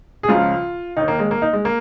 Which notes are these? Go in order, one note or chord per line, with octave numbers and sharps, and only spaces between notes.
G#4
C#2 C#3 F3 F4
D#2 D#3 D#4
A#3
G#3
A#3
D#4
G#3
A#3